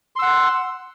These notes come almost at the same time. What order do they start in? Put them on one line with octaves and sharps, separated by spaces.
C6 E6 F#5